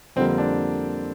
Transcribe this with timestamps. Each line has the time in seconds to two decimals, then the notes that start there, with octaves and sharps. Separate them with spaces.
0.16 F2 D3 G3 A#3 C4
0.38 D4